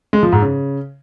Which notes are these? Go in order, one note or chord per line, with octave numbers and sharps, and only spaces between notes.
G#3
F3
G#2
C#3